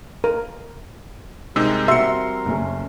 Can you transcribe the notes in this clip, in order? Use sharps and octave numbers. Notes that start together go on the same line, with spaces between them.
A#4
C3 G3 G#3 D#4 A#4 E6
C4 F#4 E5 C6 C#7
F#1 A3 C#4